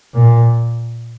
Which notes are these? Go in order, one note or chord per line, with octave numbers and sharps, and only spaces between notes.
A#2